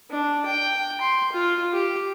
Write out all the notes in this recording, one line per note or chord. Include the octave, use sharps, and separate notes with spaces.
D4
G5
C6
F4
G4